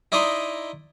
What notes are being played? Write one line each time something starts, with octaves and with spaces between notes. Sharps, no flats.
D#4 E4 D5 D#5 A#5 C6